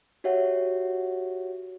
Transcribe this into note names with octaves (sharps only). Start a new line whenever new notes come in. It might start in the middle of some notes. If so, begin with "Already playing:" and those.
F#4 G4 C#5 E5 F#5